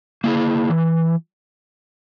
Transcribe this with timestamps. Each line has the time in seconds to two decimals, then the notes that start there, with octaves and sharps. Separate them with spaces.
0.24 A#3 E4 G#4
0.69 E3